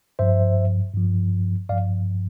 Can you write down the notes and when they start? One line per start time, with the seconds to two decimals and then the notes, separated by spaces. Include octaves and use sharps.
0.19 G2 F3 C5 E5
0.94 G2 F3
1.69 G2 D5 F5
1.72 F3